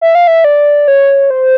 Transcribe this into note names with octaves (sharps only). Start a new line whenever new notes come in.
E5
F5
E5
D5
C#5
C5